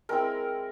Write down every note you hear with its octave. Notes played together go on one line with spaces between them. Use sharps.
G#3 C4 E4 A#4